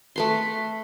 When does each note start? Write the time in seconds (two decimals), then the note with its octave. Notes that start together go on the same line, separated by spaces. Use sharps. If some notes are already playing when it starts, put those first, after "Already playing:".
0.16 A3 B4 C6